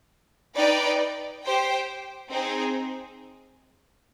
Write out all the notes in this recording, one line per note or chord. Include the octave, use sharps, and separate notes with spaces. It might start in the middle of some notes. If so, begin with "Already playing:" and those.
D#4 B4 D5 G5
G4 C5 G5
C4 D#4 G#4